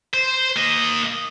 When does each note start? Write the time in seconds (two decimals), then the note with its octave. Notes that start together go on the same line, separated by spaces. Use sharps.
0.14 C5
0.56 A#3 D#5